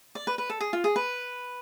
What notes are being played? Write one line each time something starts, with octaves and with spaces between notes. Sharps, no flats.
D5
B4
B4
A4
G#4
F4
G#4
B4